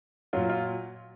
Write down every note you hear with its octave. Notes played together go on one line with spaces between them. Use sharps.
A#2 F#3 F4
F4